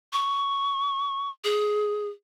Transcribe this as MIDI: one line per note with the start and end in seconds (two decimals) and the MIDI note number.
0.13 1.30 85
1.44 2.08 68